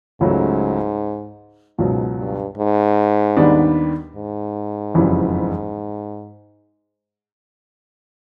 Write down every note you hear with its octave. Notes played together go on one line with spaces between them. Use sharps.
C#2 G#2 C#3 F#3 A3
C#2 G#2 B2 F#3
G2
G#2
D#2 D#3 G3 B3 D4
G#2
F#1 F2 C#3 E3 G3